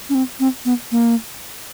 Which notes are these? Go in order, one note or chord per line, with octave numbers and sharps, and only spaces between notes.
C#4
C4
C4
B3
A#3